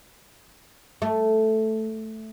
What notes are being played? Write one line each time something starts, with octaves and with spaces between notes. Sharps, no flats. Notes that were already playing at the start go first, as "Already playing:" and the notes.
A3